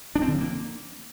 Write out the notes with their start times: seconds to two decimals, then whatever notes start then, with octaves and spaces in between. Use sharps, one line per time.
0.15 D4
0.22 C4
0.28 D3
0.34 F3
0.41 A#3